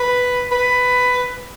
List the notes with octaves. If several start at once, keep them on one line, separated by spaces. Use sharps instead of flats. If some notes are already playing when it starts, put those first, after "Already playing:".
Already playing: B4
B4